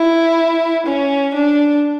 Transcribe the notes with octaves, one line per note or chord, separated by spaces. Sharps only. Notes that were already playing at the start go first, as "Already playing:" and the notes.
Already playing: E4
C#4
D4